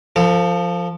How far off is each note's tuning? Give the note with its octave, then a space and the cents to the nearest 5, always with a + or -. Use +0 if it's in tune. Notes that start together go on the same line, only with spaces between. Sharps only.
F3 +0 A4 +35